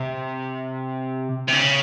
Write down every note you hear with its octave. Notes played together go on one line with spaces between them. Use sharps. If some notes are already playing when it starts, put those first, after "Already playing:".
Already playing: C3
C3
C#3